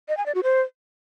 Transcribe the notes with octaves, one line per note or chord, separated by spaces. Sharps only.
D#5
G#5
D5
F#4
C5